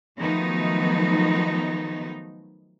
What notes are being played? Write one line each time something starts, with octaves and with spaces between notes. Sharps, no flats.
D#3 F3 F#3 A3 B3 D#4